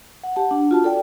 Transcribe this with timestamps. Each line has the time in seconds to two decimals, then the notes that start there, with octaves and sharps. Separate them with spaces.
0.23 F#5
0.36 G4 F#5 A5
0.51 D4
0.71 F4 F#4 A5
0.84 A4 D5 G5